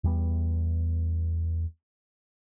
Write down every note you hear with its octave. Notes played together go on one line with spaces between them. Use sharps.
E2 G3 B3